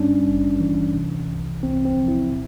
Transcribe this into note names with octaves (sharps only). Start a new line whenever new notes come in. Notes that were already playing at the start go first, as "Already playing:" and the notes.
Already playing: G2 G3 C#4 D4
G#1
E3
C3
C2
C2 C4
C4
F3
E4
A#2